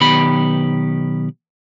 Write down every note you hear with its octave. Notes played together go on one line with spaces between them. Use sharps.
B1 D#3 B3 G4 B5